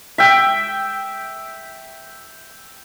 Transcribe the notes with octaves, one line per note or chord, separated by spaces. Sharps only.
E5 G5